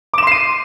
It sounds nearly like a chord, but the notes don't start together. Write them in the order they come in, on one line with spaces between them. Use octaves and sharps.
D6 E7 C6 C7 D#7